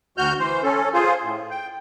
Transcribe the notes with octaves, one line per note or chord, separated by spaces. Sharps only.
D2 F#4 F6 G6
E3 C5
C#4 A4
F4 G#4 C5
A2
G5